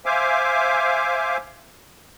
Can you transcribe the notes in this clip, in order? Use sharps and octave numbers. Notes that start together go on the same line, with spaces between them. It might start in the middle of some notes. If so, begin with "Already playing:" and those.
C5 E5 F5 G#5 D6